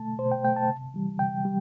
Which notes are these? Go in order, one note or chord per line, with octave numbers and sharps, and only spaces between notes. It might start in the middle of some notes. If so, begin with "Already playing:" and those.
Already playing: B2 A3 A5
B2 C5
G5
A3 G5
A5
C3
E3 G3
C3 G5
G3